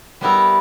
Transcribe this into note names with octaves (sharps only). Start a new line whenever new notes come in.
G3 B3 E4 G4 A#4